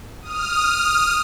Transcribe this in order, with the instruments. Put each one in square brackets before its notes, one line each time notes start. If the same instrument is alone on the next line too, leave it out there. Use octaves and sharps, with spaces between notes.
[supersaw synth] D#6 F6